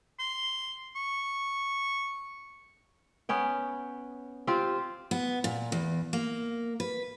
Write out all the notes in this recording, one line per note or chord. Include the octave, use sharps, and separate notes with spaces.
C6
C#6
B3 C#4 G5
C4 F4 G4
B3
A#2
E2
A#3
B4